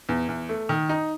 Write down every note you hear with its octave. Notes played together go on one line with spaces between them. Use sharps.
E2
E2
A3
D#3
D#4